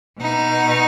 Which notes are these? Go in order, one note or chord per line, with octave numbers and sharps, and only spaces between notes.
B2 D#4